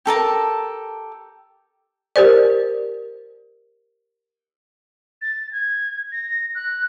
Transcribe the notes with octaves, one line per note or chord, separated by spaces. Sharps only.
G4 A4 A#4 A5
G4 A#4 C5 D5
A6
G#6
A#6
F#6